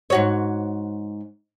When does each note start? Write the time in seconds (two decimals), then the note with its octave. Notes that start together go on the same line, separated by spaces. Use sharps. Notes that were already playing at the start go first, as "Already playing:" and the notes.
0.10 G#2 F#4 C#5